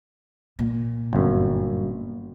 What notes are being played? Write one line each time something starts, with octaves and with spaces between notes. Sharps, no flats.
A#2
G1 F#2